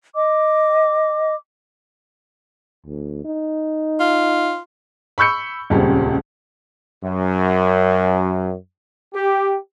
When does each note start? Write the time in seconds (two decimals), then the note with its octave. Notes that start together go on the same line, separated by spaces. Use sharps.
0.14 D#5 D6
2.86 D2
3.25 D#4
4.00 F4
5.18 B5 C#6 E6 G6 C#7
5.70 D#1 C#2 G3 C4 C#4
7.02 F#2
9.14 G4